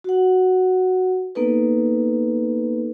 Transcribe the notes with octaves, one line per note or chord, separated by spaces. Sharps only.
F#4 F#5
A#3 B3 D#4 A4 B4